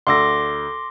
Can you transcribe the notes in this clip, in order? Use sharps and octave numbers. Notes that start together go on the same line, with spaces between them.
D2 C6 D6 E6 A#6